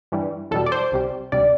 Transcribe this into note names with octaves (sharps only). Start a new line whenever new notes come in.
G2 E3 G3
E2 B2 G3 A4
D5
C5
C2 C3 G3
D2 C3 G3 D5